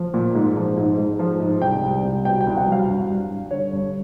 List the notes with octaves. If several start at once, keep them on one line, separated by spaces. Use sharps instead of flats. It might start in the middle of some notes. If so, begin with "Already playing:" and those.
Already playing: F3
A#2
G#2
F3
G#2
G#2
F3
G#2
C2 G5
C2
C2
B2 G5
G5
C2
F#5
F#3 F5
G2
G2
G2
D3 C#5
G2